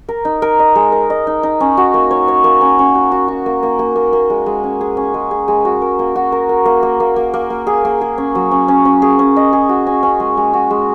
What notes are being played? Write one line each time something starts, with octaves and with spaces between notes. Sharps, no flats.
A#4
D#4
A#4
D#5
G#3
A#4
D#5
D#4
D#4
C#4
F#4
A#3
C#5
C#5
A#3
C#4
C#4
F#4
F#4
F#4
A#3
A#3
A#3
A#3
A#3
G#3
G#3
C#4
G#4
C#4
G#3
G#4
G#3
F#4
A#4
A#3
F#4
A#4
A#4
A#3
A#3
A#3
A#3
A#3
A#3
G#4
A#3
G#4
C#4
F#3
C#4
C#4
C#4
G#4
C#4
D#5
G#4
F#4
C#4
C#4
G#3
G#3
F#4
G#3